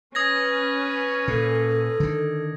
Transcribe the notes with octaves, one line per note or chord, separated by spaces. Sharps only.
C#4 B4 D#6 G#6 A#6
A#2 A4
D3 D#3